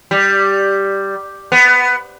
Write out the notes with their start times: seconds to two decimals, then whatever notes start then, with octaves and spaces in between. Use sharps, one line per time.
0.11 G3
1.52 B3